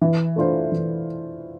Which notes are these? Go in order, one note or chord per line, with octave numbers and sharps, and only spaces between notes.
E3
A3 D4 F4 C5
E3